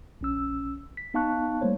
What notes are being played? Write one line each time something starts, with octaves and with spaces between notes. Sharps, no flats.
A#1 C#4 E6
B6
B3 D#4 F5 A5 C#6 F#6
G3 A3 A#3 C5 C#5